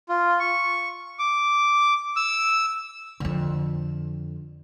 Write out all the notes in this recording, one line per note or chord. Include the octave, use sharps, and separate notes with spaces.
F4
C#6
D6
E6
F2 D3